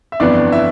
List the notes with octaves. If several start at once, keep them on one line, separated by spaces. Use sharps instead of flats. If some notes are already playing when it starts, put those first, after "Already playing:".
E5
G1 F2 E3 B3 D4 D5
E4 E5